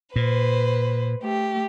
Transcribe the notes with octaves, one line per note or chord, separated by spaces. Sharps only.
A#2 B4 C5
A3 G4